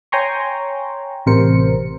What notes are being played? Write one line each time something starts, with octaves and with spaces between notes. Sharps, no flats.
C#5 G5 G#5 A#5 C6 C#6
A1 C3 A#4 C5 C#7